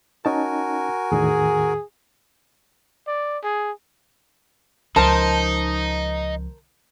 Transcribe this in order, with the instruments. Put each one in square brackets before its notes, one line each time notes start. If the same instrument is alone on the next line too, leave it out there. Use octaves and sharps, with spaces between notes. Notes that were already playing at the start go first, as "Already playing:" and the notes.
[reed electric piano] C#4 D#4 A5 [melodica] F#4 A#4 G#5
[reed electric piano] E2 A2 D#3 [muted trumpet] G#4
[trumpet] D5
G#4
[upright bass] C#2 F3 [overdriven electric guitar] D#4 [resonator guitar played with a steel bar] A#4 C5 A5